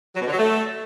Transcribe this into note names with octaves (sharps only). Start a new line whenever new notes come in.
F#3
B2
D3
F#3
A3